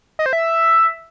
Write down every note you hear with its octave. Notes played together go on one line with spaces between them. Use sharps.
D#5
C5
E5